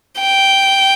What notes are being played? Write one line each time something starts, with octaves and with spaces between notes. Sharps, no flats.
G5